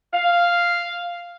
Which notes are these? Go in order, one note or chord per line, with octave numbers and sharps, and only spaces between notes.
F5